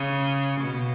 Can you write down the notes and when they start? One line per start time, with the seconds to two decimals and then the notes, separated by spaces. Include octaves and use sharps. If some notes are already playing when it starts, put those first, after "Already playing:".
Already playing: C#3
0.61 B2